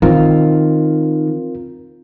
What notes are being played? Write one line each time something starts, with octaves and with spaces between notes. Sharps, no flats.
D#3 C4 F4 A#4